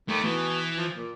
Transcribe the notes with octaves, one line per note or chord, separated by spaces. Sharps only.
D#2 A3
B2 E3
F3
A#2